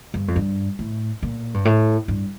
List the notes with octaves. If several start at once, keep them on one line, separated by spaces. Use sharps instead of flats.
G2
F2
G2
A2
A#2
G2
A2
G2